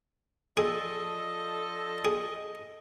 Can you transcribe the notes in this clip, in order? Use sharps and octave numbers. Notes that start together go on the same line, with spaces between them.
F3 D4 G#4 A4 D#5
G#4